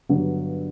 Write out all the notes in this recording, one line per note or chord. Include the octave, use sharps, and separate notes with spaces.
G2 D3 F#3 B3